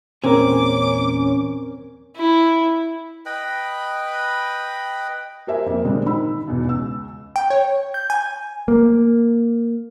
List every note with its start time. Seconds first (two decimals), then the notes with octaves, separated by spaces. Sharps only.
0.24 E2 A#2 C4 C#4 G#4 A#4 D6
2.16 E4
3.26 B4 D#5 G5 B5
5.47 G4 A#4 C5 E5 G#5
5.66 F2 A#3
5.84 A#2 D3 G3 G#3 C4 D4
6.05 D#3 D#4 B5 E6
6.47 E2 B2
6.65 C#2 E6
7.36 G5
7.50 C#5
7.94 G6
8.10 G#5
8.68 A#3